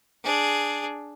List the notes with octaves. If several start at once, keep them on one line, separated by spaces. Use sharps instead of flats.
D4 G#4